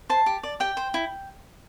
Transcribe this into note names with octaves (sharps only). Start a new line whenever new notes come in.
C5 A5
G4
D5
G4 G5
C5
E4